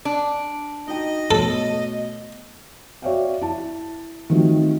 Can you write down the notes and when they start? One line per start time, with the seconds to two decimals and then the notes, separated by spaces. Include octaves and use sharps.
0.05 D4
0.88 D#4 F#4 D#5 G5
1.31 B2 A3 A4 C#5
3.02 F#4 C#5 D5 E5 F5 G5
3.41 E4 A5
4.30 D#3 G3 A3 C4 F4 F#4